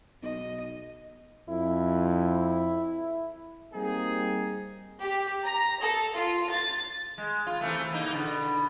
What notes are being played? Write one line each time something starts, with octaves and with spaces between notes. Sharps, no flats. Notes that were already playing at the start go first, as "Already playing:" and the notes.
B1 D#5
F2 E4
G3 A#3 C4 D#4 G#4
G4
A#5
A4
F4
A6
G#3
F4
C3 E3 A3
E2 A#3 D#4
B2 D3